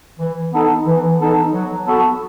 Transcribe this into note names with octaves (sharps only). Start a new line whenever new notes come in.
E3
B3 D#4 A4
E3
B3 D#4 A4
F#3
B3 F#4 A4